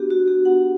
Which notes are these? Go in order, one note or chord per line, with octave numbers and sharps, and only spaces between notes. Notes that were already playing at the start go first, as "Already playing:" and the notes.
Already playing: B3 D4 F#4 G4
F#4
G4
B3 D4 F#4 F#5